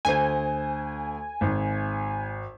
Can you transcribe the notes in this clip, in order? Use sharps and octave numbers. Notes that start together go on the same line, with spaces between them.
D2 C5 G#5
G#1